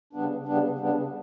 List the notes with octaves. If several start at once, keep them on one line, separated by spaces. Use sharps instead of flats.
C#3 G3 B3 D4
C#3 G3 B3 D4
C#3 G3 B3 D4